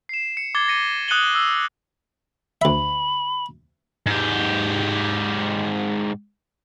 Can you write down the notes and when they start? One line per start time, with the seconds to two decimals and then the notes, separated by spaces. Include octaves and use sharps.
0.09 C7 E7
0.37 C#7
0.55 D6 G#6 A6 G7
0.68 A#6 C#7 D#7
1.08 D#6 F#6 C#7 D#7 F#7 G7
1.35 E6
2.62 D2 E5 B5
4.06 G#2 G4